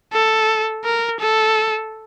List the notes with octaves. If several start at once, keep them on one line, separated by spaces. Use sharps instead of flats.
A4
A#4
A4